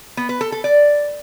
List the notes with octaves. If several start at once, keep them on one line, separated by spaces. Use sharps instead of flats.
B3
B4
A4
A4
D5